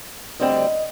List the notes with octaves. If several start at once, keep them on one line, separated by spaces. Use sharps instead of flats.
D2 D3 G3 C4 D#5